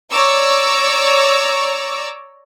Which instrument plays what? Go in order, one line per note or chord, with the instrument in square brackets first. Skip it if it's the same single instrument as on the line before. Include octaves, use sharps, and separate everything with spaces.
[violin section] C#5 D5 A#5 C#6 D6 E6